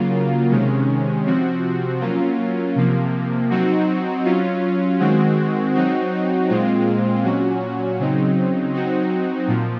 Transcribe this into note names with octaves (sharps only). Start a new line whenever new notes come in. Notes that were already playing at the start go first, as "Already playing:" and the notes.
Already playing: C#3 F#3 A#3 F4
C3 D#3 G#3 C#4
C3 F3 C4 F#4
F#3 A#3 C#4 F4
C3 F3 A#3
F#3 C4 D#4 F#4
F#3 C#4 F4
D#3 G#3 C4 F#4
F#3 C4 D#4 F#4
A#2 G#3 C4 F4
A#2 F#3 C#4 F#4
C#3 F#3 C4 D#4
F#3 C4 D#4 F#4
A#2 F3